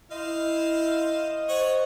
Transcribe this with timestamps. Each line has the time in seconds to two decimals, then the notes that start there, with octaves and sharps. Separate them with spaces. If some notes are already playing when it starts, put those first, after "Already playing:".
0.11 E4 C5 D#5 F5
1.49 C5 C#5 F#5 C#6